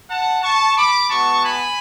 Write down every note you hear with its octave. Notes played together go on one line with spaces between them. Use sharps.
F#5 A5
A5 C#6
B5 D6
G#3 B3 F#4 A5 C#6
G#5 B5